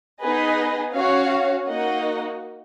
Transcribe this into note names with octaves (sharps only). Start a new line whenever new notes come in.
B3 D#4 G#4 B4 D#5
C#4 F#4 C#5 F5
A#3 D#4 F#4 D#5 F#5